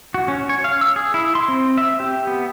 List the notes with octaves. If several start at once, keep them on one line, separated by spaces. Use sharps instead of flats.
F#4
C#4
C#5
F5
E6
G#4
E4
C6
C4
E5
G4
B3